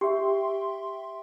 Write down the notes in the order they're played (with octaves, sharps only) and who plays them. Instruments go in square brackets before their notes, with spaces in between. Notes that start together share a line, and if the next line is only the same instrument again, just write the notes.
[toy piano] G4 [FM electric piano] E5 G5 C6